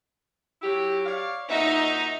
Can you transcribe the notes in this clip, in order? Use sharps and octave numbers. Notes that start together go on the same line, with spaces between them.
F#3 E4 G4
C#5 D5 F5
A#2 D#4 F#4 E5